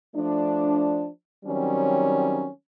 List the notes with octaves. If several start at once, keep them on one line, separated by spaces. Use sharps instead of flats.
F3 A3 D4
D#3 F#3 G3 C4 C#4